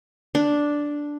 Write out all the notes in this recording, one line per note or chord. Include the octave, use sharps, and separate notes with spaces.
D4